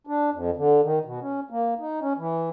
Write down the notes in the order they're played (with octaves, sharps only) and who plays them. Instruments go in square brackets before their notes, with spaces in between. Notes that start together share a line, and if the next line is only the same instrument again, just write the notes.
[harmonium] D4
F2
D3
D#3
B2
C#4
A#3
D#4
C#4
E3